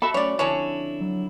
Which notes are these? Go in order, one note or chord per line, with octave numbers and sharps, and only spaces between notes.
F#4 A4 E5 B5
F#2 A3 C#4 C#5 D5
F2 D3 C#4 D4 E4 C#5
F#3